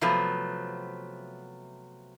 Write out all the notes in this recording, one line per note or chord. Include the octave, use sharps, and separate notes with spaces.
C3 F3 F#3 A3 B3